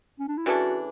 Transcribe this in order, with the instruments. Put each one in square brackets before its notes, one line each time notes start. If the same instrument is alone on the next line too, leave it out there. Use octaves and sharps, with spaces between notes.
[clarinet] C#4
D4
E4
[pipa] C#3 E3 A3 D4 [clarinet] F#4